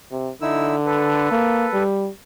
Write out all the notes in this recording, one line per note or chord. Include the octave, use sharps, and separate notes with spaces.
C3
D3 D#4 E4 E6
A4 B4
A#3
G3